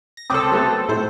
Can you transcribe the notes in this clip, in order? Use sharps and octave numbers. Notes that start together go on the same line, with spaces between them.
A#6
C#2 C4 A4 D6 D#6
F#3 A3 B3
A2 A3 C5